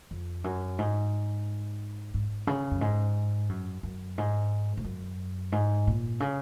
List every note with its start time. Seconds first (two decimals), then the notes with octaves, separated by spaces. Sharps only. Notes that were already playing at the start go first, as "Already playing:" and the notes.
0.11 F2
0.44 F#2
0.78 G#2
2.14 G#2
2.47 C#3
2.71 F#2
2.81 G#2
3.49 F#2
3.83 F#2
4.18 G#2
4.77 G#2
4.84 F#2
5.52 G#2
5.87 A#2
6.20 C#3